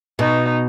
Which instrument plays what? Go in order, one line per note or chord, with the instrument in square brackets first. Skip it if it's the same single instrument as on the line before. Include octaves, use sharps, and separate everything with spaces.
[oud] B2 [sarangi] D#4